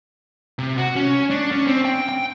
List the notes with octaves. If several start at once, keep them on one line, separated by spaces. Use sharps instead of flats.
C3
F#4
C#4
D4
C#4
C4
G5
G5